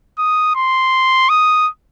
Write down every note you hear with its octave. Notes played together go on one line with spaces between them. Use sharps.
D#6
C6
D#6